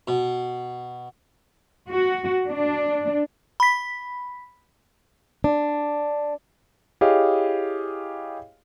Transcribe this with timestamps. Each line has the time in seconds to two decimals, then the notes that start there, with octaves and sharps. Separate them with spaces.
0.08 B2
1.89 F#4
2.48 D4
3.60 B5 B6
5.44 D4
7.01 E4 G4 G#4 C#5 D#5 F5